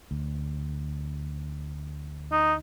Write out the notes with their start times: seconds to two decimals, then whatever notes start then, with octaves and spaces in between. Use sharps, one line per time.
0.11 D2
2.32 D#4